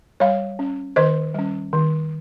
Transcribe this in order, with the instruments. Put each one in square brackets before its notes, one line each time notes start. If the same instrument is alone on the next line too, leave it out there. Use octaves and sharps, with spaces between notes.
[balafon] G3 C#5 F5
C#4
D#3 C5 D#5
G3 C#4
D#3